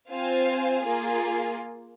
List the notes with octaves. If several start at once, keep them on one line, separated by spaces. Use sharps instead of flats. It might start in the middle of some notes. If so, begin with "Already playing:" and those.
C4 F4 C5 F5 G#5
A#3 F4 G#4